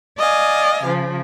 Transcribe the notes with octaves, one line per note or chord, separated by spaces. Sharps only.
D5 D#5 F5 G#5
C#3 F3